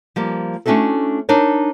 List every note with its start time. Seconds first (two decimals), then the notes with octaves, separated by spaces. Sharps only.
0.16 F3 G3 A#3
0.66 A3 C#4 D4 E4 F#4 A4
1.29 D4 D#4 A#4 C#5